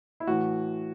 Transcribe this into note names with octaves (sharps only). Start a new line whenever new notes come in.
E4
A2 E3 F#4